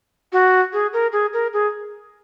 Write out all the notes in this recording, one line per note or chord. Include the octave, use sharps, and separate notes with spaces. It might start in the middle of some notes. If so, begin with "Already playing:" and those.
F#4
G#4
A#4
G#4
A#4
G#4